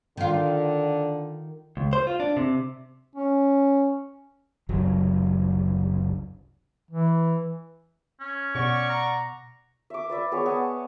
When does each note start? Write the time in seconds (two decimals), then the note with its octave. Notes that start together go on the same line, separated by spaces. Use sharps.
0.17 D3 D#3 F4
1.77 C#2
1.93 C5
2.07 F4
2.20 D4
2.37 C3
3.16 C#4
4.69 F#1 C2 F#3
6.91 E3
8.20 C#4
8.55 B2 D5 F#5 C#6
8.90 A#5
9.90 E5 D6
10.09 B4 D5 E5
10.31 B3 G#4 B4 C#5
10.46 B3 A5